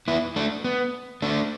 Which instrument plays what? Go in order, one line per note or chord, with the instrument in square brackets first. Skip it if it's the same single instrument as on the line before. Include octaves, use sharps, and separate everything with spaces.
[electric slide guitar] B3 E4
A3 D4
B3
A3 D4